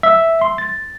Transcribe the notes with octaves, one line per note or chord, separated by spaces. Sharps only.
E5
C6
A6